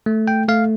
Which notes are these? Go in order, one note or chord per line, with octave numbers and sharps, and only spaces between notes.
A3
G5
A3 F5